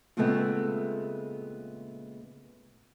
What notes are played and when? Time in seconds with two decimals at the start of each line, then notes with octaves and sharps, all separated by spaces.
0.17 A#2 C#3 G#3 A3 B3 C4